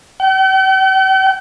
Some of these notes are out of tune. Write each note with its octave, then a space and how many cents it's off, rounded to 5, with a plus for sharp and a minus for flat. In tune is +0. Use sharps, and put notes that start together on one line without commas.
G5 -45